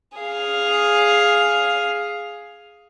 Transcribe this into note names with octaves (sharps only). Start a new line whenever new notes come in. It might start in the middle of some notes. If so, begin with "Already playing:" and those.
G#4 F5